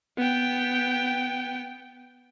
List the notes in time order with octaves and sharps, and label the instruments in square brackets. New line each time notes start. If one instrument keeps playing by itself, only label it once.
[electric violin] B3 G5